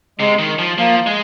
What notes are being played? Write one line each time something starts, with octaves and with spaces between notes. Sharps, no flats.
C3 G#3
D#3
F3
F3 A#3
G#3